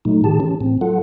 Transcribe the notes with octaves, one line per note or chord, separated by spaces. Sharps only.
A#2 F#3 A3 D#4
A2 D#3 G4 G#4 A5
E3 C#4
A2 C4
F#3 F4 A4 F#5